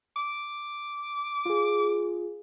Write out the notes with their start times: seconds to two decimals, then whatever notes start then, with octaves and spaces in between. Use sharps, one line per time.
0.16 D6
1.45 F4 G#4